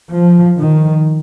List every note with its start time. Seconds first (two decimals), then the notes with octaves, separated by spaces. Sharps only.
0.13 F3
0.57 D#3